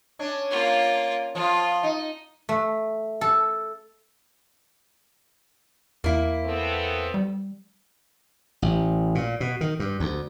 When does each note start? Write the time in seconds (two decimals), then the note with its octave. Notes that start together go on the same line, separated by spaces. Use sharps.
0.19 C#4 D4
0.51 A#3 F4
1.35 F3 F4
1.83 D#4
2.49 A3
3.21 A4
6.04 E2 A#3 E4
6.45 B3 C4 A4
7.14 G3
8.62 A1
9.15 A#2
9.40 B2
9.61 D#3
9.79 G2
10.00 D2